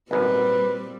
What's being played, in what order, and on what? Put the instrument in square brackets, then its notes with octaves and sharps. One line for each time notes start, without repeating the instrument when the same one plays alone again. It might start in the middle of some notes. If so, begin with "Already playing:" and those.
[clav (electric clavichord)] G#1 F#2 [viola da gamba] A#2 G3 C4 [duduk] B4